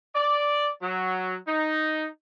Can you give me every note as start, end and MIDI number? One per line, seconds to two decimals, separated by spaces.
0.15 0.68 74
0.83 1.35 54
1.48 2.06 63